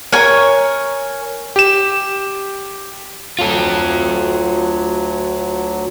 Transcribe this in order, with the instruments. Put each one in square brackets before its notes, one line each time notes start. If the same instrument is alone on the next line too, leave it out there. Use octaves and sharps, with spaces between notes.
[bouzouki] A#4 C#5 G#5
[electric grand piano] G4 E7
[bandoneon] D2 F#3 [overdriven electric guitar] F4 A4